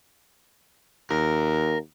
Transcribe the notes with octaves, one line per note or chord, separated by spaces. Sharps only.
D#2 A#4